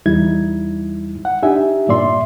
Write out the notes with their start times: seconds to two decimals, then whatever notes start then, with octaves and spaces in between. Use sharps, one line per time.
0.06 E2 G3 D#4 E4 G#6
1.25 F#5
1.43 D4 D#4 G4 E5 G#5
1.88 G2 A#2 D5 E5 C6